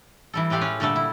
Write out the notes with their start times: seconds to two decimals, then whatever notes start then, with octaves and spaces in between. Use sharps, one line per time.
0.34 E3 G3 A4
0.50 A2 G#3 G4 A4 F5
0.61 C#4 B4
0.80 A#2 D3 G3 A3 A4
0.96 E4